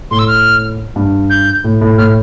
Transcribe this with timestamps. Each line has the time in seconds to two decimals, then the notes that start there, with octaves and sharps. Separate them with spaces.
0.11 A2 C6
0.19 E6
0.28 F6
0.96 G2
1.30 G6
1.64 A2
1.81 A2
1.98 A2 F6